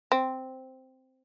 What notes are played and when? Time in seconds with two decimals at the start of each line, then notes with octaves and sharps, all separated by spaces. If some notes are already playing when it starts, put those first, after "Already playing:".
0.12 C4